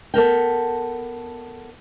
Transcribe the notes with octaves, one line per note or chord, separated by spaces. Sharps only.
B3 A4 A#4 G5